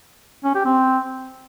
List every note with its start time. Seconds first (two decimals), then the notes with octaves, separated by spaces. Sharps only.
0.44 C#4
0.55 G4
0.66 C4